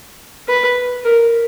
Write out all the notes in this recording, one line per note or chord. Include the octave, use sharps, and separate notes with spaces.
B4
A#4